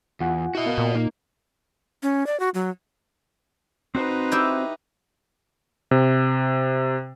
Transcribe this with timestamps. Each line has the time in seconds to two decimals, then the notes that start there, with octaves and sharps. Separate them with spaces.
0.20 E2 F4 F#5 G#5
0.55 E4 F#4 D#5 E5
0.66 B3 A#4 F5
0.78 A#2
0.95 A#3 D#4
2.03 C#4
2.27 D5
2.40 F#4
2.54 F#3
3.95 C4 D#4 F#4 B4 C5
4.32 E4 G4 G5
5.91 C3